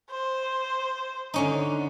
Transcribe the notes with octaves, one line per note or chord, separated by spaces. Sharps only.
C5
D3 C#4 D#4